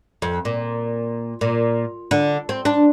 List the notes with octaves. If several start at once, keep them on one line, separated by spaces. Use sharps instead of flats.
F2
A#2
A#2
D3
C4
D4